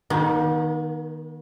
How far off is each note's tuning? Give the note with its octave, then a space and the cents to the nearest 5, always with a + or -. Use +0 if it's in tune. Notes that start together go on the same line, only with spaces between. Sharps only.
D#3 +0 B3 -45